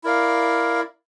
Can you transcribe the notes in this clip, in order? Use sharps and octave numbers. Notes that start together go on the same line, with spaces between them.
E4 A#4 D5 F5